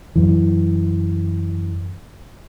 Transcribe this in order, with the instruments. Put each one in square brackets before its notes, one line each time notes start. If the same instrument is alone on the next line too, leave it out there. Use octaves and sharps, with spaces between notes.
[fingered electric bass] F#2 E3